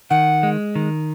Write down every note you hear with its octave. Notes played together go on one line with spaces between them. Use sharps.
D#3 F#5
G#3
D#3